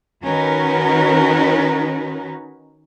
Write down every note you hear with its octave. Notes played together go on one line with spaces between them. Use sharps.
D#3 C#4 D#4 F#4 A#4 B4